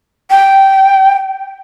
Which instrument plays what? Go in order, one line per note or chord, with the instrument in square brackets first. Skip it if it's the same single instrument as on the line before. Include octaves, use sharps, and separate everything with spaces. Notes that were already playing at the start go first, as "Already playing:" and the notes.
[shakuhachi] G5